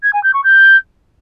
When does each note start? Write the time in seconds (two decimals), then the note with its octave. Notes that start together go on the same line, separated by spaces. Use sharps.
0.03 G#6
0.13 G#5
0.23 G6
0.34 C#6
0.44 G6